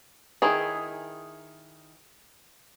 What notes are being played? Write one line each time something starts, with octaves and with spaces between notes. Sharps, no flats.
D#3 E4 G#4